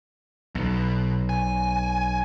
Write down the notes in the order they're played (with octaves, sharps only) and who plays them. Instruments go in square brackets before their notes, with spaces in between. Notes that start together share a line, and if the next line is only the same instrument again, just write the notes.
[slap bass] B1 [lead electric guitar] B2
[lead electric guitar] G#5